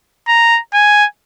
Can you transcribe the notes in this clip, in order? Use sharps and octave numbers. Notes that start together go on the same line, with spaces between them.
A#5
G#5